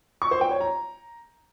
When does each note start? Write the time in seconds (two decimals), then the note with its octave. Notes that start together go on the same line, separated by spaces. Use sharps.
0.22 C#6
0.31 C5
0.41 G5
0.51 C#5
0.61 A#5